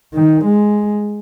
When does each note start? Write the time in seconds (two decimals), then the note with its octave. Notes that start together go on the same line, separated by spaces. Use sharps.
0.15 D#3
0.45 G#3